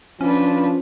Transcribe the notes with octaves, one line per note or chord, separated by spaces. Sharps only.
F3 C#4 D4 B4